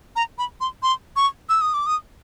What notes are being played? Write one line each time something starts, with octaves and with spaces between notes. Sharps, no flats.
A#5
B5
C6
C6
C#6
E6
D#6
D6
D#6